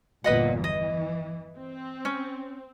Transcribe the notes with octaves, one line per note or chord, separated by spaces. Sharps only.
G1 E2 A#2 B4 D#5 F#5
E3 D#5
C4
C#4